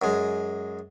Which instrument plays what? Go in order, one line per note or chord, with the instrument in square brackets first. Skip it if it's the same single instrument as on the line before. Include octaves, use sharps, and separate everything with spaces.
[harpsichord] F#2 G#3